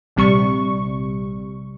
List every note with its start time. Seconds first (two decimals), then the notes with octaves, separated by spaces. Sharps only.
0.16 A#1 C3 G3 C#6